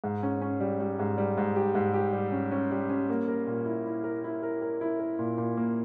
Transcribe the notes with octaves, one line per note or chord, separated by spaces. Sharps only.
G#2
C#4
C#4
G3
G3
G#2
G3
G#2
G4
G#2
G4
G3
C#4
C#4
G3
C#4
A#3
A#4
A#2
E4
E4
A#4
E4
A#4
A#4
E4
A#4
A#2
A#2
A#3